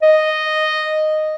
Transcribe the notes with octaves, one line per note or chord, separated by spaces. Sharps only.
D#5